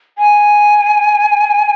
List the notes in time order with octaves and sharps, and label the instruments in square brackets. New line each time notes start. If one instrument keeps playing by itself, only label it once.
[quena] G#5